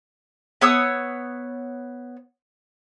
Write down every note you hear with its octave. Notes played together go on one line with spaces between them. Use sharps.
B3 C#5 D#6 E6